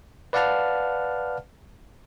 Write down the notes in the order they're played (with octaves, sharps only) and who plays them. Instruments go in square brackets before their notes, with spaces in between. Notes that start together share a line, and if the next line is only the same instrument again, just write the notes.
[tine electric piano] B4 D5 F5 F#5 A5 F6